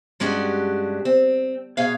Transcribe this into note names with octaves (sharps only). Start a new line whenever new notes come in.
G2 G#3 C#4 D4 F#4 G4
C4
B2 G#4 C#5 F5